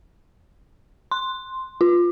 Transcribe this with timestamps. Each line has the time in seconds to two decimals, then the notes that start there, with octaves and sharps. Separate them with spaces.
1.11 C6
1.81 F4